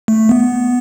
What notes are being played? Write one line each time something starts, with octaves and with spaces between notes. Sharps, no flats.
A3
B3